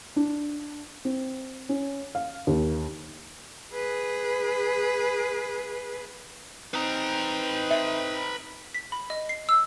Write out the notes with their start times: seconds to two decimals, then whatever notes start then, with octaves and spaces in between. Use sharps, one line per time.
0.16 D4
1.05 C4
1.69 C#4
2.15 F5
2.47 D#2
3.74 G#4 B4
6.74 C4 D#4 B4 A#5
7.71 E5
8.74 B6
8.92 B5
9.10 D#5
9.29 C7
9.49 E6